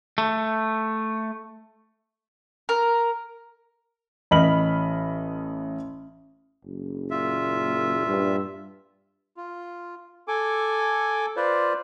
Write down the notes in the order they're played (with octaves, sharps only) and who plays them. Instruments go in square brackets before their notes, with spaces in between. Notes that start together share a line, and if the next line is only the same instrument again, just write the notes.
[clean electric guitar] A3
[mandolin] A#4
[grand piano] A1 D#5 B5 F6 F#7
[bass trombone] F#1
[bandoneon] A#2 F4 E5
[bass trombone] G2
[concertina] F4
A4 G#5 D6
F4 B4 C5 D5